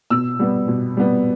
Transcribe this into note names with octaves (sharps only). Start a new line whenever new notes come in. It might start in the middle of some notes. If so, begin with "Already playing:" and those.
B2 E6
G3 B3
B2
G3 B3